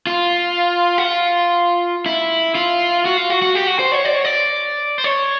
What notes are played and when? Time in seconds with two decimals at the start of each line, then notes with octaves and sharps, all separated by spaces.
0.07 F4
0.98 F#4
1.05 F4
2.06 E4
2.55 F4
3.05 F#4
3.17 F4
3.30 F#4
3.42 F#4
3.55 G4
3.67 F#4
3.79 C5
3.92 C#5
4.05 D5
4.15 C#5
4.25 D5
4.98 C5
5.04 C#5